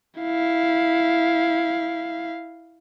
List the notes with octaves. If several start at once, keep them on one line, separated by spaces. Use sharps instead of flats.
E4 F5